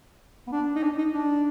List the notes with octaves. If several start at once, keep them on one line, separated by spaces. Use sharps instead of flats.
B3
D4
D#4
D4
D#4
D4